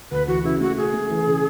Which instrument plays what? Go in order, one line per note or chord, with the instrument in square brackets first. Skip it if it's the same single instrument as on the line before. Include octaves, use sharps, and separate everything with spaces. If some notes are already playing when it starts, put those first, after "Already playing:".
[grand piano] D2 [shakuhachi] B4
[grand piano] E3 [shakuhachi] F#4
[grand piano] C#3 [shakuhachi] E4
[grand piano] A3 [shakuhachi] F#4
[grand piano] C#3 [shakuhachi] G#4
[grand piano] A3
E3
C#3